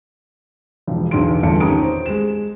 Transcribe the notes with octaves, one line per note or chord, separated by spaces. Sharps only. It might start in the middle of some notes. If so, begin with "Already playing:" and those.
E1 F3
B1 E2 D3 C6 D7
G1 E2 A3 F4 A5 C#7
D#3 C#4 G4 A#5 D#6 D7
C5
G#3 E7